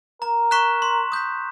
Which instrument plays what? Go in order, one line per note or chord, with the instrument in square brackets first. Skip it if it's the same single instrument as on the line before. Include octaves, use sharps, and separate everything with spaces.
[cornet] A#4 [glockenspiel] A#5
[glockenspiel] C#6 F#6 B6 E7
C6
D#6 G6 B6